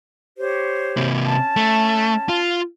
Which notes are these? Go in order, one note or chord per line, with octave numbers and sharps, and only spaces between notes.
G4 C5 C#5
C3 A#3
C#4 A5
A3
F4